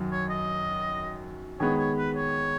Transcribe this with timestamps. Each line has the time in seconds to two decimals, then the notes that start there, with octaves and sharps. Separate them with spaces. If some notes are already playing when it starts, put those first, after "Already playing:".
Already playing: F#2 D#3 F#3
0.12 C#5
0.30 D#5
1.60 D#3 G#3 B3 C#5
1.78 C#5
1.97 B4
2.16 C#5